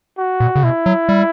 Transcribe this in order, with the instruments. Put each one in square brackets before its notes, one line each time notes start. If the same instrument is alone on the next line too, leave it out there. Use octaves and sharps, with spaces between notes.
[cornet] F#4
[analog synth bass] A#2
C#3
[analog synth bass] B2 [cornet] E4
[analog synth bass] F#3
G3